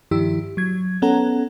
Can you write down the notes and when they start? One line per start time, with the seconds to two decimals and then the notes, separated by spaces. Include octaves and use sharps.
0.11 G2 D#3 F3 E4 G4 E6
0.57 F#3 G#6
1.02 B3 C#4 A4 F#5 A#5